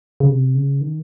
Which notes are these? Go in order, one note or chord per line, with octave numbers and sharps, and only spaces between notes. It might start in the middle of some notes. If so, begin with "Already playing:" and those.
C#3
C3
C#3
D#3